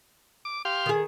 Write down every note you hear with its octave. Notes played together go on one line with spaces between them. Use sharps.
D6
G4 F5 C6
D#3 G#4